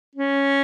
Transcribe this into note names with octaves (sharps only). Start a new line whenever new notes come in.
C#4